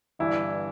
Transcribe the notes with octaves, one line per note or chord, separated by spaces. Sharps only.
G1 G2 E3 E4